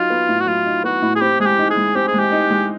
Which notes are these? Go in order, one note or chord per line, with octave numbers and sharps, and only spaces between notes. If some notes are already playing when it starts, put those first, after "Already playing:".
Already playing: F#3 D#4 F4
B3
A2
F#4
F#3 F4
D#4
B3 F#4
A2
G#4
C4 G4
G#3 G#4
G4
D#4
G#4
G#3
C4 G4
G#4
G#3
G4
D#4
G#3